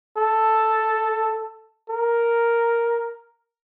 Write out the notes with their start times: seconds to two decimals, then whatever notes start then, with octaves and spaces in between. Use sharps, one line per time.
0.17 A4
1.90 A#4